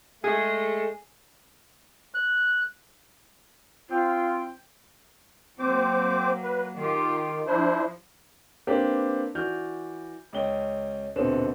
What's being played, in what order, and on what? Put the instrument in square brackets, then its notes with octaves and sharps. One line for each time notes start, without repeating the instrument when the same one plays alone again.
[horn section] G#3 A3 [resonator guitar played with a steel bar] G#4
[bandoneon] F#6
[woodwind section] C4 G5 [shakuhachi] F4
[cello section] F#3 A#3 [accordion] C4 C5 D6
[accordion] B4
[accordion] D#3 [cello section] F4 G4
[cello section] F3 [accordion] D4 E4 C5
[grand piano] A#3 C4 D4 G4 B4
E3 F#4 D5 F6 G6
C#2 C#4 G5 G7
D#1 B2 D3 C4 B4 E7